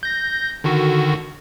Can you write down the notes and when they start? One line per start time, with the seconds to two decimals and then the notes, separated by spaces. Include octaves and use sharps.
0.03 G6 A#6
0.64 D3 D#3 F#4